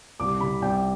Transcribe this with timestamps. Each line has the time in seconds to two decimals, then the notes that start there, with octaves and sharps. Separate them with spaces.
0.20 C2 D6
0.40 C3 B5
0.62 C2 G5